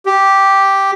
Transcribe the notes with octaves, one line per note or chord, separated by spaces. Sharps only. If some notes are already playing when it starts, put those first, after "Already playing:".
G4